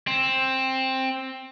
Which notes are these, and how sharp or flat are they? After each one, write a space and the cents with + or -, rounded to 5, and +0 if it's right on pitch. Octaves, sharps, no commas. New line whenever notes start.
C4 +10